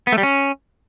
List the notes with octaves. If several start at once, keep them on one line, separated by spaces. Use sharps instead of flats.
B3
A3
G3
C#4